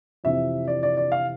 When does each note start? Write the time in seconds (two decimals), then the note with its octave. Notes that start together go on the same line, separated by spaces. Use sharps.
0.24 F2 C3 E3 E5
0.68 D5
0.83 D5
0.97 D5
1.12 F5